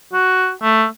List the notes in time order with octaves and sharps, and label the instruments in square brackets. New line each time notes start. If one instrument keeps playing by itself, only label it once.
[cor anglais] F#4
A3